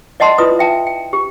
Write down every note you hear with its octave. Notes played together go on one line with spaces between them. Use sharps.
D5 D#5 F#5 A5 C6
E4 F4 B4 D5 D#6
E5 G5 A5
G5
G4